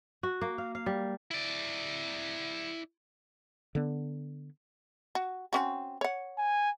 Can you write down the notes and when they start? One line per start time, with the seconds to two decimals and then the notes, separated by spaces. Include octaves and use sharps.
0.23 F#4
0.41 A#3
0.58 F5
0.75 F5
0.86 G3
1.31 E4 D5
3.75 D3 B3
5.15 F#4
5.53 C4 C#4 F#4
6.01 C#5 F#5
6.38 G#5